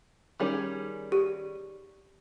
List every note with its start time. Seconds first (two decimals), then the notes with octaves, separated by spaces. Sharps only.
0.40 D#3 G3 C#4 G#4
1.12 G4